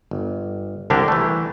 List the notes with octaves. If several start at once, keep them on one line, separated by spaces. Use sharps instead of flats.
G1
C2 D3 D4 G4 A#4
E3 A3